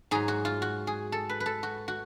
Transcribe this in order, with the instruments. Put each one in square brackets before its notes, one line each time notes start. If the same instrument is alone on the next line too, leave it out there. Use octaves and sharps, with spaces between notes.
[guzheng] G#2 F#3 G#4
F#4
F4
F#4
G#4
A4
B4
B4
A4
F#4
F#4